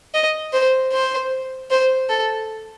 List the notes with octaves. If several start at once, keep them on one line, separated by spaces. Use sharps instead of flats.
D#5
C5
C5
C5
A4